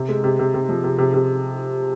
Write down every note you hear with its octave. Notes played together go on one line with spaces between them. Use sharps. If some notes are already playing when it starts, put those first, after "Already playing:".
Already playing: C3
G#3
C3
C3
C3
F3
C3
C3
C3